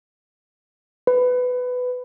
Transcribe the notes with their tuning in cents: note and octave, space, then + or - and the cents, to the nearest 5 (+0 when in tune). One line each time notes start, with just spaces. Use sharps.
B4 +15